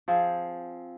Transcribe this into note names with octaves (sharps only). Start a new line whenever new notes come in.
F3 C4 F4 G#4